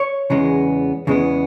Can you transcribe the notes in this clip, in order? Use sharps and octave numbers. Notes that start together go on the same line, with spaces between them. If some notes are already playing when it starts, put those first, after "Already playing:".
Already playing: C#5
E2 C#3 E3 G#3 B3
E2 C#3 E3 G#3 B3